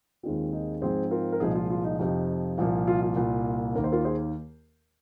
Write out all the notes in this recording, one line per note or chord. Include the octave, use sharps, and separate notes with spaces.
D#2 D#3 G#3 C4 F4
D#4 G#4
G#2 F3 C4 G#4 C5
F4 A#4
A#4
C2 A#2 F3 G#3 D#4 G#4
F4
F4
D#4
F2 C3 F3 D#4
C2 A#2 F3 A#3
F4
F4
C2 A#2 A#3
D#2 D#3 A#3 A#4
C5
F4 A#4
G#4 C5